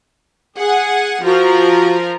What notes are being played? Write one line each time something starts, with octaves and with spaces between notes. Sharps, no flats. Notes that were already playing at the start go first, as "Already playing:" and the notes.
G#4 F#5
F3 F#4 A#4